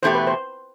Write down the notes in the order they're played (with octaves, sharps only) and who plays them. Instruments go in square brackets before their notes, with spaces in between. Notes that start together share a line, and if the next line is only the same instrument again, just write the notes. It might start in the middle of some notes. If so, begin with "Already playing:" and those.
[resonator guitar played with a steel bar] E2 B2 A3 E4 G4 [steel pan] C5
[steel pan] B4
C5